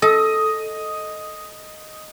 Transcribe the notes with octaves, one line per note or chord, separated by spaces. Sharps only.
A4 D#5